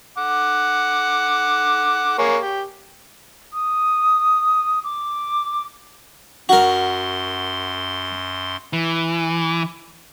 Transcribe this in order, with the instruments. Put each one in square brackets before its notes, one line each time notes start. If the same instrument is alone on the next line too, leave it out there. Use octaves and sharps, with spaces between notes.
[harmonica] F#5 D6
A#3 G#4 C#5
G4
[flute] D#6
D6
[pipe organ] F#2 C6 [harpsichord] F#4 A#4
[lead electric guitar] E3